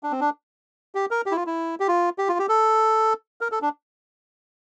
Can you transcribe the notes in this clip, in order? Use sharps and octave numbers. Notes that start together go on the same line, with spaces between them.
D4
C4
D4
G4
A#4
G4
E4
F4
E4
G4
F4
G4
F4
G4
A4
A#4
A4
D4